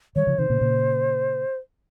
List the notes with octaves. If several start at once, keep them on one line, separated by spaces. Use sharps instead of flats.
D#3 G3 C#5
C#3 F3
C3 D#3 C5
A#2 C#3
A#2 C#3